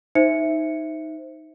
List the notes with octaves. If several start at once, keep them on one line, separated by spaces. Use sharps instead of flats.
D#4 C5 E5 C#7